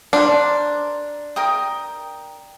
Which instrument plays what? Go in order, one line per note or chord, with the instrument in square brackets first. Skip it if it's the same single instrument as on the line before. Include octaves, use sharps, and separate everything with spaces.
[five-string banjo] D4 [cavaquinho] A#4 C5
[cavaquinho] A#4 G5 D#6